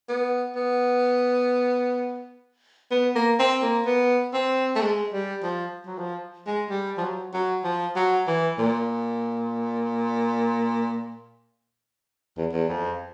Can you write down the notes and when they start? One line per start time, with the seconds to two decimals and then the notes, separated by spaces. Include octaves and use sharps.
0.09 B3
0.56 B3
2.91 B3
3.16 A#3
3.39 C4
3.63 A#3
3.86 B3
4.34 C4
4.76 A3
4.82 G#3
5.13 G3
5.43 F3
5.87 F#3
5.99 F3
6.47 G#3
6.70 G3
6.98 F3
7.01 F#3
7.34 F#3
7.64 F3
7.96 F#3
8.27 E3
8.59 A#2
12.37 E2
12.53 E2
12.69 F2